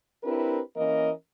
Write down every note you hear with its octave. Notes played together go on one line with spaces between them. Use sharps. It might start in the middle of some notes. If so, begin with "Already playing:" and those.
C4 D4 E4 G4 A#4 B4
E3 A#3 C#4 A#4 D#5